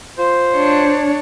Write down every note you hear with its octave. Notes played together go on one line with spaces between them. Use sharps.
F4 C5
D4 C#5